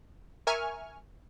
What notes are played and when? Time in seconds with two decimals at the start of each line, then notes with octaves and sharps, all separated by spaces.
0.47 A#4 E5 G#5 C#6 F6